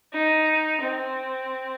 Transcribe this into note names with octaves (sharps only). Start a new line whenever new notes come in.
D#4
C4